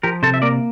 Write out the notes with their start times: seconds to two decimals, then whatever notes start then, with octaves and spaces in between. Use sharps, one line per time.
0.03 F3 G4 A#4
0.23 C3 A4 C5
0.34 E5
0.42 A#3 A#4 D5